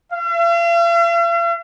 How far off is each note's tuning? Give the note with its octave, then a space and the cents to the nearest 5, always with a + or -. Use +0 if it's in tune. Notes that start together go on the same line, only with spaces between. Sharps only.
F5 -45